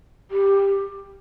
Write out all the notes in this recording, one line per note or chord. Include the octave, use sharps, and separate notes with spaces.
G4